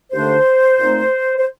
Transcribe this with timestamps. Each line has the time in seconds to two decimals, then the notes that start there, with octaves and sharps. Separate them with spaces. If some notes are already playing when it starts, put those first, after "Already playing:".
0.12 D#2 D3 A3 D4 C5
0.79 A#2 A3 C4 D#4
1.39 C5